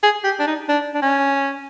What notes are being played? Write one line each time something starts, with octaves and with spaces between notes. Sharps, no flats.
G#4
G4
D4
D#4
D4
D4
C#4